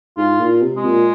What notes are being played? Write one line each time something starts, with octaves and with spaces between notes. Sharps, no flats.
G#2 F4
A#2
C3
G#3
A#2